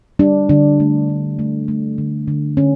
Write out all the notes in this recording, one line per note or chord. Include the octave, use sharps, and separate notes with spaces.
G3 D4
D3 D4
A3
A3
A3
A3
D3
D3
D3 C#4